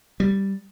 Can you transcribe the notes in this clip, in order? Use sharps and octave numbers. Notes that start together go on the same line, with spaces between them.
G3